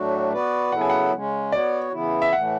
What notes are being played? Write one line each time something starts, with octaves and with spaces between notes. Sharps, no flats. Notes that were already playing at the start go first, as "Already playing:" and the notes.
Already playing: A2 F#3 A3 D4 F#4
B3 F#4 B4 D5
C#3 F#3 B3 E4 A4 F#5
G#5
F#5
C#3 G#3 C#4
B3 F#4 C#5 D5
C#3 E3 B3 E4
E5
A2 E3 A3 F#5